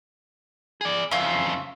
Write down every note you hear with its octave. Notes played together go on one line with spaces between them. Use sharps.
G#4 D5
F2 C#3 F4 E5